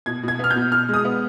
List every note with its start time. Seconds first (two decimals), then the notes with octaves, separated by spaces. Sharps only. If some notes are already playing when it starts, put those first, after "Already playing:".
0.06 B2 G#6
0.23 B2 G#6
0.39 B3 F6
0.51 G6
0.56 B2
0.72 B2 F6
0.89 G#3 D#6
1.05 B3